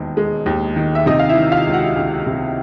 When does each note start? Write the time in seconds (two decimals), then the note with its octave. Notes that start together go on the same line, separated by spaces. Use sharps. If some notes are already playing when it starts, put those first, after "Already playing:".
Already playing: E1 D#2 D#3
0.17 G#3
0.46 D#2
0.76 D#3
0.95 E5
1.06 C3 D#4 D#5
1.19 F5
1.29 E4 E5
1.37 D#3
1.51 F4 F5
1.67 C#2
1.73 F#4 F#5
1.96 C#2
2.27 C3